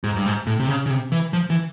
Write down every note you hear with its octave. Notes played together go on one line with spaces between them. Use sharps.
G#2
G2
G#2
A2
C3
C#3
C#3
C3
E3
F3
E3